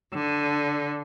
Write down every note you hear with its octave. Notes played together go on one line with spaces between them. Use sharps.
D3